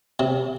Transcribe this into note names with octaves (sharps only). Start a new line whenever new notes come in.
C3